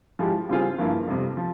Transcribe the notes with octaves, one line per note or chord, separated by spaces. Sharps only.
F3 G#3 E4 G4
C#3 G3 C4 F4 G#4
G2 F3 A#3 E4
F2 C3 G3
F3